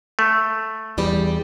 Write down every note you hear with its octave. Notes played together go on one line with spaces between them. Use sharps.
A3
E2 G3 G4